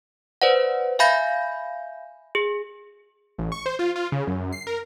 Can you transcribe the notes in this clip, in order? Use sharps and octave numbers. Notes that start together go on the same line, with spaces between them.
B4 C5 D5 F#5
E5 F5 G#5 B5 G6 A#6
G#4
A1
C#6
C5
F4
F4
C#3
F#2
C7
A#4